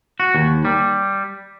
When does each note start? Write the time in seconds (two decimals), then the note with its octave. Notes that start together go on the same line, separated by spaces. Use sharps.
0.20 F#4
0.35 D#2
0.65 G3